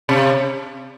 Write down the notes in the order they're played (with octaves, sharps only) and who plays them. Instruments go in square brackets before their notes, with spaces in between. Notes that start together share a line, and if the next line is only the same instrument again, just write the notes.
[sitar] C3